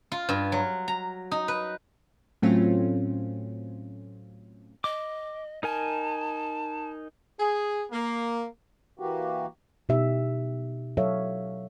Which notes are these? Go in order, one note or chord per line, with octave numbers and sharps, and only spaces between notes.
F4
G2
F#3
A#5
D#4
B4
A2 F#3 A3 C4 C#4 F4
D#5 D6
D#4 A#4 G#5 A5
G#4
A#3
E3 A#3 F#4 G4
B2 D#4 G4 E5
F#3 A4 C#5 E5 F5